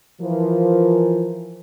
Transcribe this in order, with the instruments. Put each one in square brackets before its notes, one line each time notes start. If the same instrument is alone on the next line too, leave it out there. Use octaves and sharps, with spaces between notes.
[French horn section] E3 F3 A#4